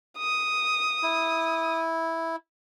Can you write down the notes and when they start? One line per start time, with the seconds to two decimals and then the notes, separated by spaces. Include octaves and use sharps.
0.18 D#6
1.03 E4